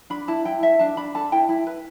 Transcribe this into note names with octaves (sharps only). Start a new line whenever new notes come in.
D4 B5
E4 A5
E4 G5
A4 E5
D4 A5
D4 B5
A4 A5
E4 G5
E4
B4